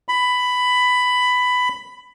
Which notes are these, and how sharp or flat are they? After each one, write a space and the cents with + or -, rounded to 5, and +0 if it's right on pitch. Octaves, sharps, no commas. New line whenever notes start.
B5 +10